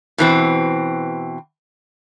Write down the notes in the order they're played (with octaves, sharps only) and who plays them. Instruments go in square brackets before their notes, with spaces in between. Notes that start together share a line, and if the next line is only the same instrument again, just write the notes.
[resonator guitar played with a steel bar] B2 E3 C4